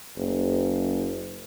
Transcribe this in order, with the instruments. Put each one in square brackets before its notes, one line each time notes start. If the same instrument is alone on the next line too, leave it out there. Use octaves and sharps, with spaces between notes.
[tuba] F#1